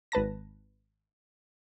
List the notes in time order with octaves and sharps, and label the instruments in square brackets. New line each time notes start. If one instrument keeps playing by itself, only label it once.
[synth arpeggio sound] G#1 B4 A5 A#6